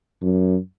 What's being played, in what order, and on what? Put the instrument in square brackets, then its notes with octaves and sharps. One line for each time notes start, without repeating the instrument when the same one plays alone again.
[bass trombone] F#2